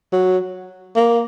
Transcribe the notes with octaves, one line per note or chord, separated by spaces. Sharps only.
F#3
A#3